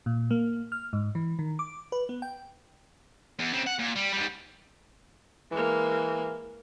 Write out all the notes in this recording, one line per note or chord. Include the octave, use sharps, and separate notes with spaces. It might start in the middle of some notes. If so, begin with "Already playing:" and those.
A#2
A#3
F6
G#2
E3
D#3
D6
B4
B3
G5
E2
C#3 C4
F#5
A#2
G3
G#2 G3
E3 G#3 A#3